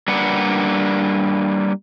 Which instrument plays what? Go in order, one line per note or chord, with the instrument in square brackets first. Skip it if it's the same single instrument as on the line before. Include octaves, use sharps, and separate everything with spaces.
[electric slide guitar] G3 A#3 D4 B4 F#5